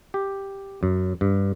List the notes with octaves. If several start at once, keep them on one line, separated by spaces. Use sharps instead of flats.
G4
F#2
G2